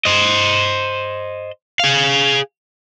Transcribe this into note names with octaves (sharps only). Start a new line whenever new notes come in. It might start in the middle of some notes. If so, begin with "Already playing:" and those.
C5 D#5
G#4 F5